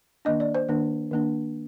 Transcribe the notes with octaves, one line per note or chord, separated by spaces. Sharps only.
D#3 A#3 D4 D#5
D5
C5
D#3 A#3 D4
D#3 A#3 D4